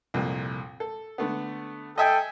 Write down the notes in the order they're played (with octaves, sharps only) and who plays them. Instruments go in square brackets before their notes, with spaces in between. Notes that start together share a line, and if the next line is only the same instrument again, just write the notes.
[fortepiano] C2 F2 A#2
A4
D3 A3 B3
[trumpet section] A4 G5 [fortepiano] D#5 E5 G#5